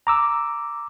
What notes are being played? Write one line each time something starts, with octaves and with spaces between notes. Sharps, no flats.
A#5 D6 E6